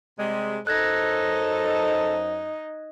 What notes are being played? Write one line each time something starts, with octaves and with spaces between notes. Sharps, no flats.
C3 G3 G#3
F#2 D#4 A4 C5 F#6 G#6 A#6